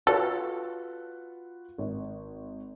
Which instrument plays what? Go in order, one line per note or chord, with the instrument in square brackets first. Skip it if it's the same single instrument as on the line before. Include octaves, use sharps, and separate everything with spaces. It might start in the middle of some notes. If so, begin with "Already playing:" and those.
[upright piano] F4 F#4 B4 [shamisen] A4
[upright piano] G#1